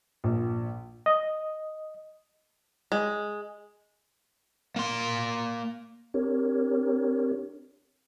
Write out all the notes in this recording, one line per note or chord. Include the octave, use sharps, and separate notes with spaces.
A#1
D#5
G#3
A#3 C6
C4 D4 G4 A#4 C#5